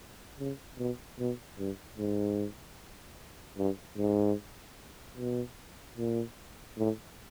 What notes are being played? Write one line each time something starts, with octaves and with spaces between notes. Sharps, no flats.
C#3
B2
B2
G2
G#2
G2
G#2
B2
A#2
A2